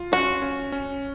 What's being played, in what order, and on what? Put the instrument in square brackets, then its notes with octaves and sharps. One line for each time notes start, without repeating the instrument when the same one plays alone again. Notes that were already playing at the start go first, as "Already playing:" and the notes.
Already playing: [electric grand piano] F4
[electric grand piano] C#4 [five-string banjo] F#4
[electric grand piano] C#4
C#4